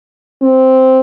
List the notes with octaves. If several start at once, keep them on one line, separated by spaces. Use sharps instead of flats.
C4